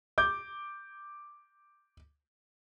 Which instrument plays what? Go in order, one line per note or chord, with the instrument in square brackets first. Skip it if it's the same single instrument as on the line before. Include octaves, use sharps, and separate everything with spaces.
[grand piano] D6 G6